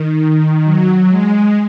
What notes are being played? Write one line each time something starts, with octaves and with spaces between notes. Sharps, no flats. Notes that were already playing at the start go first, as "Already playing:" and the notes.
Already playing: D#3
F#3
G#3